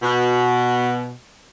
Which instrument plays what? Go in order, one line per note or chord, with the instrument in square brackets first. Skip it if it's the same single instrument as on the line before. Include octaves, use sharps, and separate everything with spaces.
[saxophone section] B2